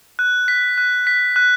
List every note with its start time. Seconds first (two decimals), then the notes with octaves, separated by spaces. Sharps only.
0.19 F#6
0.48 B6
0.78 F#6
1.07 B6
1.36 F#6